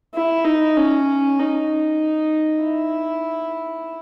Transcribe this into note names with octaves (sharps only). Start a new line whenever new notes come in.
E4
D#4
C#4
D#4
E4